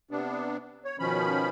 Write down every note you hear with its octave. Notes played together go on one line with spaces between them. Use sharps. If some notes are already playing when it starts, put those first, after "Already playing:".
C3 B3 D4
C#5
B2 D#3 F3 C#4 B5